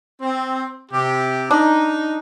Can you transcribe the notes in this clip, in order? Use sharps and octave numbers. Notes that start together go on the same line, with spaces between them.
C4
C3 G4
D4 D#4